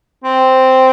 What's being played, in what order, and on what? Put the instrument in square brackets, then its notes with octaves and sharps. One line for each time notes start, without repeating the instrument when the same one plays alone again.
[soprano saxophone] C4